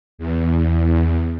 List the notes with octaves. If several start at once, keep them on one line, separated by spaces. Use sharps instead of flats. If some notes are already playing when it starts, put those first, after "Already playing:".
E2